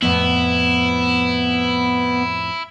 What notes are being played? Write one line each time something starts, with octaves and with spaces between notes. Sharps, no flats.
F2 A2 F3 B3 E4